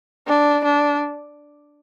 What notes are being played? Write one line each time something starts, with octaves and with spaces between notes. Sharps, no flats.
D4
D4